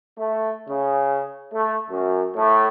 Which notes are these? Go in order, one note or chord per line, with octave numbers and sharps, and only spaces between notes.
A3
C#3
A3
F#2
A2